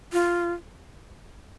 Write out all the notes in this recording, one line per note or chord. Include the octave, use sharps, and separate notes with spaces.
F4